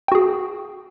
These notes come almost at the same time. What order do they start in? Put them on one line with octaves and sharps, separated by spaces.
G5 F#4 G#4